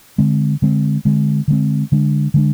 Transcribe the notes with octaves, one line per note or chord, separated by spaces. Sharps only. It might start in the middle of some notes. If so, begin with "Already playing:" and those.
D3 G#3 C4
D3 G#3 C4
D3 G#3 C4
D3 G#3 C4
D3 G#3 D4
D3 G#3 D4